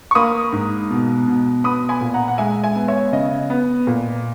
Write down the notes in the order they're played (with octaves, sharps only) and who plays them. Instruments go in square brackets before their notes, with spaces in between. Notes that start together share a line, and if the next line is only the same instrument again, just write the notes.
[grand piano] C#6
A#3 B5 D#6
G#2
B2
B2
B3 B5 D#6
G#5 B5
A#2
F#5 A#5
F#5
G#3 E5 G#5
E5 G#5
B3
C#5 E5
C#3 D#5
B3
A#2